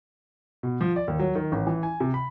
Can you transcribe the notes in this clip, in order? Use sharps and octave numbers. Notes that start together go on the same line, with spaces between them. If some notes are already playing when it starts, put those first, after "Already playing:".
B2
F3
D5
D#2
F#3
D#3
A1
E3
G#5
C3
B5